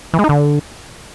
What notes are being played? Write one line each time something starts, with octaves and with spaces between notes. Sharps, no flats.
E3
G#3
D#4
D3